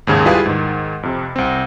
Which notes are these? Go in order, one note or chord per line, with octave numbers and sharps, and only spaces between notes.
D#2 G#2 C#3 G#4 G#6
G3 E4 F4 G4 G#4 B4
G#2 D#3
F2 C3
C2 C4